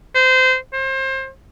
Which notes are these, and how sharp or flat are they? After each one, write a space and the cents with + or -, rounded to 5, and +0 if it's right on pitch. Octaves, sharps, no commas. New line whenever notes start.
C5 -25
C5 +30